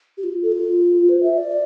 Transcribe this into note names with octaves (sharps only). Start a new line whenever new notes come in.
G4
F4
A4
F4
C5
E5
D5